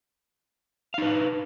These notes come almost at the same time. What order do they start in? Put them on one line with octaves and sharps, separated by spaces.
F5 D#4 B4